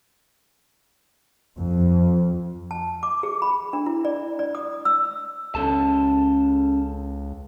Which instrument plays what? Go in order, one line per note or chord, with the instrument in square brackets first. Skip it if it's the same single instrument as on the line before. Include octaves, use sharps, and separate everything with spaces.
[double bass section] F2
[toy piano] A5
D6
G#4
B5
D4
E4
D5
D5
D#6
E6
[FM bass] C#2 [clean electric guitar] C#4 A4 A5